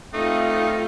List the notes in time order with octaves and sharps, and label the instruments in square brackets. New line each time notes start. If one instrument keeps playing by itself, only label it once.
[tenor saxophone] A3 [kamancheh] C4 F4 [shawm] D#4
[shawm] D#4